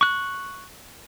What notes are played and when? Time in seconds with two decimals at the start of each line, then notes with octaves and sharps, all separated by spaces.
0.01 C#6 F#6